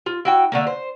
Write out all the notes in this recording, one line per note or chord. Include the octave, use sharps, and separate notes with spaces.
F4
E4 F#4 G5
D3 A3 A#3
C5